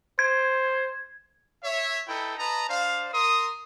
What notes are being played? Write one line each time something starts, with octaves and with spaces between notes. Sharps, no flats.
C5 G#6
C#5 E5
D#4 E4 A4 B4 G5
B4 D#5 A5 A#5
D4 C5 D5 F5
A#4 C6 D#6